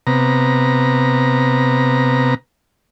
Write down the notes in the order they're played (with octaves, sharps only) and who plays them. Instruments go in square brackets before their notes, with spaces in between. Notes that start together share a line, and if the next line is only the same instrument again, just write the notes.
[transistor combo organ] C3 B3 A#5